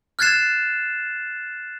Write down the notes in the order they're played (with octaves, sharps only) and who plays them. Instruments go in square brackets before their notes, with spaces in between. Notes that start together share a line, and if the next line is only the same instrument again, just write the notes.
[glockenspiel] F6 F#6 G#6 A6 C7 E7